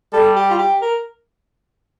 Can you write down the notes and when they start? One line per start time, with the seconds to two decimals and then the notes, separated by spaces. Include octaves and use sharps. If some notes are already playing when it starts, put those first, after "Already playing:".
0.13 G3 A4
0.36 G4
0.51 F4
0.59 G4
0.82 A#4